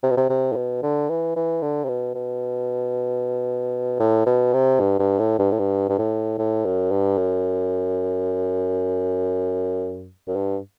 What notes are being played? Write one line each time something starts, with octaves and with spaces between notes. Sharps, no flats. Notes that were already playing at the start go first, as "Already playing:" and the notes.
C3
B2
C3
C3
A2
B2
D3
E3
E3
D3
C3
B2
B2
A2
B2
C3
G2
G2
A2
G2
A2
G2
G2
A2
A2
F#2
G2
F#2
F#2
G2